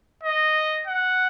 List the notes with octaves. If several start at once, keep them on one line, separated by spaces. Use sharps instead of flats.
D#5
F#5